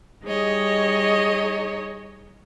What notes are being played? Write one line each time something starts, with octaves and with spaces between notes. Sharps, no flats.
G3 D#4 G#4 C#5 D#5